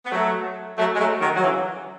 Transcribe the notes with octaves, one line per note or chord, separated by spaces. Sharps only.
B3
F#3 A3
F#3 A3
G#3
F#3 A3
D#3 F#3
F#3
C#3 E3